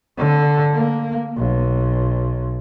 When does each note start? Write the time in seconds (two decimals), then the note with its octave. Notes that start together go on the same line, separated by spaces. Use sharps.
0.18 D3
0.74 A#3
1.37 B1